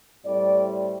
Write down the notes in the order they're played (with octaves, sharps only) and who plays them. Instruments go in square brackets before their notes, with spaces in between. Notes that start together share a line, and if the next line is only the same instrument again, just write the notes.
[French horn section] A2 G3 C4 D5